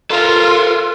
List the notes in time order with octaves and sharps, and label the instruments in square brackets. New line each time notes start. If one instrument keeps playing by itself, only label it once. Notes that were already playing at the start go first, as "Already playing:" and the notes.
[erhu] F4 [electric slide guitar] A4 A#4